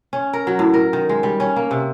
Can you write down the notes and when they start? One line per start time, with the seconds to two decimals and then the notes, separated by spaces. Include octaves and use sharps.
0.13 C#4
0.33 A#4
0.47 F#3
0.59 A2
0.74 A#4
0.93 D#3
1.09 G#3
1.23 G3
1.40 C#4
1.56 A#3
1.71 C3